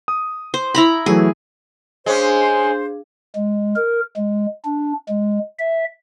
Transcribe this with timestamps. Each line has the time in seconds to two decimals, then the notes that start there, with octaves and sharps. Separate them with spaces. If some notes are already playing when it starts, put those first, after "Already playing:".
0.08 D#6
0.54 C5
0.75 E4 A#5 B5
1.06 E3 F#3 A3 G#4
2.06 G#3 C#4 D4 G#4 C5 F5
3.35 G#3
3.76 A#4
4.16 G#3
4.65 D4
5.09 G#3
5.59 E5